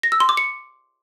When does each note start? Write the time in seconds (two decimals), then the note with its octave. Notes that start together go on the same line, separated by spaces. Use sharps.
0.03 A#6
0.12 E6
0.20 C6
0.29 D6
0.37 C#7